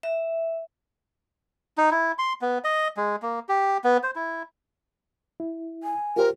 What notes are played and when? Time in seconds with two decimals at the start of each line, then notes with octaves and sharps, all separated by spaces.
0.03 E5
1.77 D#4
1.91 E4
2.18 C6
2.41 B3
2.64 D#5
2.97 G#3
3.22 A#3
3.49 G4
3.84 B3
4.03 C5
4.16 E4
5.40 E4
5.83 G#5
6.16 F4 G4 A#4 C5